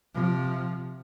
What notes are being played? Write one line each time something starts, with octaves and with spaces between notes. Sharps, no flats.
C3 F3